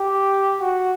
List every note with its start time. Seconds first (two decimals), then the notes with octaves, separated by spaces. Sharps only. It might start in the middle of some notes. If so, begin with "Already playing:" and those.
Already playing: G4
0.61 F#4